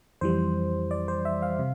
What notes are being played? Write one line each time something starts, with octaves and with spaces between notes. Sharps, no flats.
F2 E3 G3 C5
D5
C5
E5
F5
C3